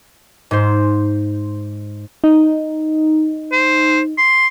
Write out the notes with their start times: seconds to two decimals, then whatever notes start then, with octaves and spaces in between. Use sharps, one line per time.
0.51 G#2 C5
2.24 D#4
3.52 C5
4.18 C6